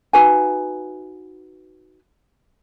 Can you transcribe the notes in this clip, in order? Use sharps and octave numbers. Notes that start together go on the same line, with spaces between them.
D#4 F#4 B4 G#5